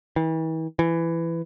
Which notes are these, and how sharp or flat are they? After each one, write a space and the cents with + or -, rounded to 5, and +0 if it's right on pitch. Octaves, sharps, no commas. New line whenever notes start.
E3 -40
E3 +15